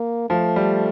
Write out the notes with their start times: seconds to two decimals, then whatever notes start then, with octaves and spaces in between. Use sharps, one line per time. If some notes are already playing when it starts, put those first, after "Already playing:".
Already playing: A#3
0.30 F3 A3
0.56 G3